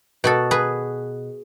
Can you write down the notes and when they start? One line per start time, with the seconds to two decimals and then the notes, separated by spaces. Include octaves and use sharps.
0.24 B2 F#4 A4
0.51 G#4 B4